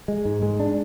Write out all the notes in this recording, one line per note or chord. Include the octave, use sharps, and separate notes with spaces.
G#3
G#2
G#3
D4